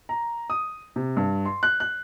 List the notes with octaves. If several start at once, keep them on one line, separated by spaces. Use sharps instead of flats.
A#5
D#6
C3
G2
C6
F#6
F#6